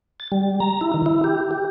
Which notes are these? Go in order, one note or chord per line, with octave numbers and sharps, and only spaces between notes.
A6
G3
A#5
E4
D#3
E4
G4
G4